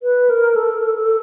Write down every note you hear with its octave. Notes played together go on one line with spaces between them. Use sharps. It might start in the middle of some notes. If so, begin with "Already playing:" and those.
B4
A#4
A4